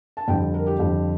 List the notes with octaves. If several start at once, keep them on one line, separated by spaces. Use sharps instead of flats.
A5
F2 D3 G3 G5
A#4
G4
F2 D3 G3